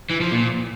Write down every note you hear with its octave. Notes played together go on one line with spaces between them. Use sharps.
E3
F3
A#2